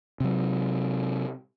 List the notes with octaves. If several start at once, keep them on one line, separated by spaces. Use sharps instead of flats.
C3 F#3